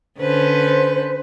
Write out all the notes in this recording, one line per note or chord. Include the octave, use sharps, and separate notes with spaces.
D3 C#4 B4 C5